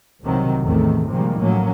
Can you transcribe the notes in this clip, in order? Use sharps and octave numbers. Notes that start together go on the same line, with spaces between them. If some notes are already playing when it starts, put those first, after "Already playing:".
C2 C3 D#3 F#3
A1 E2 C3 D#3 A3
C3 D#3 F3 G3 G#3 A#3
A2 F3 F#3 A#3 C#4